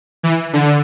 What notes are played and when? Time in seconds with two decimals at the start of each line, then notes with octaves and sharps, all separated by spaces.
0.23 E3
0.53 D3